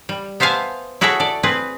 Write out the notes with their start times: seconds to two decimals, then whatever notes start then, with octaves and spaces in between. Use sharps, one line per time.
0.09 G3
0.40 B3 C5 E5 F5 G#5 A5
1.01 E4 F#4 G#4 A4 C#5 E5
1.20 A4 D5
1.43 C4 G#4 B4